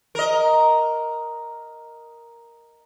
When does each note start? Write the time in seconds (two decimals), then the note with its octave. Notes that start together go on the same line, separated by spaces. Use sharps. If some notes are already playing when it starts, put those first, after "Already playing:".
0.15 A#4 D#5